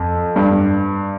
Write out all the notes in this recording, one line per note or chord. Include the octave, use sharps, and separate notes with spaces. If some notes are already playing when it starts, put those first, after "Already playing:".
Already playing: F2
G2